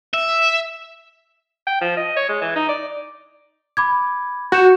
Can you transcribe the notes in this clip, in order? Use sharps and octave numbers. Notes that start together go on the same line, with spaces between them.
E5
G5
F3
D#5
C#5
G#3
E3
D#4
D5
B5 D6 G#6
F#4 F#6 G6 E7